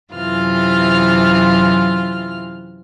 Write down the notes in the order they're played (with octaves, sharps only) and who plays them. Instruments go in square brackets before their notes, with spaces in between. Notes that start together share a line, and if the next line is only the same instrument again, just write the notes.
[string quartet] F#2 C3 E3 F4 F6